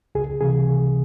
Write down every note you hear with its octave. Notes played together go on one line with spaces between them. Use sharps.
C#2 G#4
C3 E3 G#4